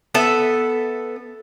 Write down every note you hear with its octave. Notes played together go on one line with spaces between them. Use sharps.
B3 A4 E5